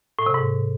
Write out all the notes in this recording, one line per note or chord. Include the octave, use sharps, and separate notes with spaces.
A2
C3
G#2